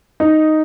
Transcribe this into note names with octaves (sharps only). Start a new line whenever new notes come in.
D#4